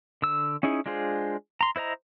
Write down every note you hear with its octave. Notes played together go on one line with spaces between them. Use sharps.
D3 E6
C#4 D#4 E4 G#4
G#3 D4 F4 G#4 C5
A#5 C6
E4 C5 D#5 A#5